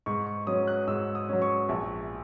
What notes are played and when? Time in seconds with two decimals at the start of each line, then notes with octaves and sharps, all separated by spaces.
0.06 G#2 C#6
0.26 C#6
0.47 F#3 C#4 D#6
0.68 F#6
0.88 G#2 E6
1.15 D#6
1.29 F#3 C#4
1.42 C#6
1.69 A#1 E5